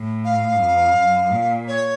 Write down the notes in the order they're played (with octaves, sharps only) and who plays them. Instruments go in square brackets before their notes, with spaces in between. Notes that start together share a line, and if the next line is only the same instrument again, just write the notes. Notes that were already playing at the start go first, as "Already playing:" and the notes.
Already playing: [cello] A2
[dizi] F5
[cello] F2
F#2
A#2
[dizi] C#5